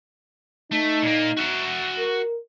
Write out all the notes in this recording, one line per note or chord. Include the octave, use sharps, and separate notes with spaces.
A3 D#4
A#2 A#3
F#4 E5
A#4